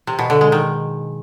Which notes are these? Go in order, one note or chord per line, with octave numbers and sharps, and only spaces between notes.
C3
B2
D3
G#3
D#3